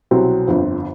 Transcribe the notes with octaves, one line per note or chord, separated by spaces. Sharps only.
C2 B2 F#3 C4
G1 F2 D3